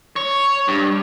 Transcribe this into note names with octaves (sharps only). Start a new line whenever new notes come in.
C#5
G2